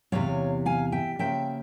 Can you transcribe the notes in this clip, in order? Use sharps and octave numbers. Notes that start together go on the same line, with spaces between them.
E2 C3 F3 A#3 C#5 F5
F5 G#5
E5 G5
C#3 F3 A#3 E5 G5